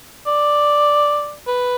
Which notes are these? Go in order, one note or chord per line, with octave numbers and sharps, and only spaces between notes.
D5
B4